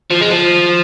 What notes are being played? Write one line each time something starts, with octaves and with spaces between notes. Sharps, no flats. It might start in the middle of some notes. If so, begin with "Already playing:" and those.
F3
G#3
F3